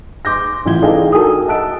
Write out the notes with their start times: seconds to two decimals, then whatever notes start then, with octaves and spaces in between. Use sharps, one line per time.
0.25 C6 D6 G6 A#6
0.66 A1 E3 F4 G#6 G7
0.82 D4 D#4 G#4 A4 F5 G5
1.12 F#4 A4 A#4 G5 G#5 D#6
1.48 D#5 F#5 A5 E6 F#6 D7